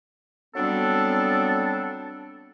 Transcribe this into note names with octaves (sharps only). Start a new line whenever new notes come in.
F#3 G3 B3 C4 D4 A4